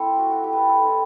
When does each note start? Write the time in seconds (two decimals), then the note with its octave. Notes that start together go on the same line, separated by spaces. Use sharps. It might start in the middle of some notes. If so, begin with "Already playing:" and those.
Already playing: A3 C4 E4 A4
0.18 F#4
0.31 F#4
0.44 G4
0.53 A4 B4
0.69 A4
0.81 G3 C4 E4